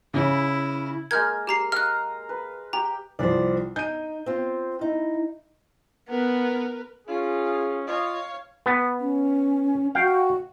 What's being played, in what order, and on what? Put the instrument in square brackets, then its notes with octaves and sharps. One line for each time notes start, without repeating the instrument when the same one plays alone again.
[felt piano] C#3 [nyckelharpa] E4
[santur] G#3 A#3 A#4 [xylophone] F6 G6 G#6
[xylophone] G4 A#5 C7
[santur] D#5 F5 A#5 [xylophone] F6 F#6
[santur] B4
[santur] G4 G5 [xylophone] A#5
[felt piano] C2 F3 G3 [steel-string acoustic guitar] C5 D5
[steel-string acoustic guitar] D#4 [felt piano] G6 D#7
[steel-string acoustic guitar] C4 F4
[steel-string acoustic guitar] D#4 [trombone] E4
[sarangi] B3 [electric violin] A#4 B4
[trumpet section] C#4 G#4 [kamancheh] F4
[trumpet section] F4 D#5 [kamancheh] C#5 F5
[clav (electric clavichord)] B3
[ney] C#4
[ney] F#4 [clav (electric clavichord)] F5 G5